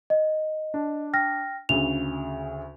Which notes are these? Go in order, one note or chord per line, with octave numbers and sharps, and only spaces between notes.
D#5
D4
G5 F6 A#6
D2 C#3 G#4 F7